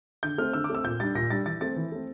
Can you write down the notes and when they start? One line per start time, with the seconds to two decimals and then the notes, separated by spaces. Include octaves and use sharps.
0.23 D3 G6
0.38 A3 C4 F6
0.54 D3 E6
0.64 D6
0.70 A3 C4 E6
0.84 A#2 G6
1.00 G3 D4 A6
1.15 A#2 A#6
1.30 G3 D4 A6
1.46 E3 A6
1.61 A3 C4 A6
1.76 E3
1.92 A3 C4